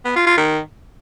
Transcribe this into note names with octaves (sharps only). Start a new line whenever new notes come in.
B3
F4
F4
D#3